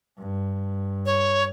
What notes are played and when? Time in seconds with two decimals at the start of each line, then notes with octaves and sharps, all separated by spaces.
0.18 G2
1.06 C#5